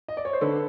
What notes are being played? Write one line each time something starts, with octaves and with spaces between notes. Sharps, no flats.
D#5
D5
C#5
C5
D3 A4 B4